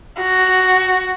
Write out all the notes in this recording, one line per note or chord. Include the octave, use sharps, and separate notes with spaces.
F#4